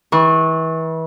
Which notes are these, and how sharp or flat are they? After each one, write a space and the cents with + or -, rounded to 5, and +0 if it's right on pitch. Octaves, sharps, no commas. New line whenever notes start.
E3 -30 C#6 -20